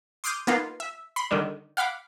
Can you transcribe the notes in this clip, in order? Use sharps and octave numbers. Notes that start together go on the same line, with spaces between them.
C6 D6 D#6 F6 G6
A#3 B3 D#4 F4
E5
B5 C6
D3 D#3 G3 D4
F5 F#5 B5 D6